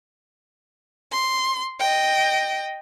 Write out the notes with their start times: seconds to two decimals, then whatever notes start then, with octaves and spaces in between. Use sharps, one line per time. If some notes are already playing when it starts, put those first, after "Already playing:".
1.12 C6
1.79 D#5 G5